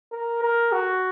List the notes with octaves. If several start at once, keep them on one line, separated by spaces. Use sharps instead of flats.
A#4
A#4
F#4